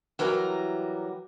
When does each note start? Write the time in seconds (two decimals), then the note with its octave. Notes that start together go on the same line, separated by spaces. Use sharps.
0.19 E3 F#3 G3 A#4 G5 A#5